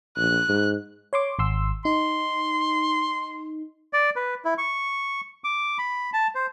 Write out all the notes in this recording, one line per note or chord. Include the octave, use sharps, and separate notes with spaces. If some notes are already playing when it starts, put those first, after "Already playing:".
A#1 F#6
G#2
C#5 C6 D6
G#1 C6 E6
D#4 C6
D5
B4
E4
C#6
D6
B5
A5
C5